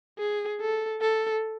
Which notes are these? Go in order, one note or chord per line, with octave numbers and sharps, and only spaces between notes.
G#4
A4
A4